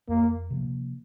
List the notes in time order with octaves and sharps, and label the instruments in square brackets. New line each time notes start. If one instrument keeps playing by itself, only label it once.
[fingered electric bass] F2 [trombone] A#3
[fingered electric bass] C3 F3 A#3